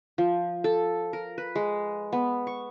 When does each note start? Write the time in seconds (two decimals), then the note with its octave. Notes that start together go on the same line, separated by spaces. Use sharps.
0.18 F3
0.64 A4
1.13 A#4
1.38 B4
1.55 G#3
2.12 B3
2.47 C#6